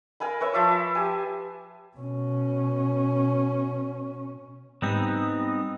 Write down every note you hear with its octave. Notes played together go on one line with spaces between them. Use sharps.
A#4 F5 G#5 B5
B4 C#5 E5
F3 E5 D6
G4 G#5
B2 C#4
G#2 G3 B3 C4 D#4 G5